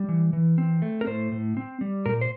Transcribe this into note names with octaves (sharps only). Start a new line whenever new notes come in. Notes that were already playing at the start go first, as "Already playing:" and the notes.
Already playing: G3
E3
E3
C4
A3
A#4
A2 C5
A2
C4
G3
A#2 A#4
C5